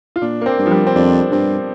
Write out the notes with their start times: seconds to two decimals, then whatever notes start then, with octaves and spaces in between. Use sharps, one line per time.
0.16 F4
0.22 A#2 D4
0.41 A#3
0.46 C4
0.58 G2
0.66 F3
0.71 G3
0.87 C4
0.96 F2 D4
1.32 G2 C4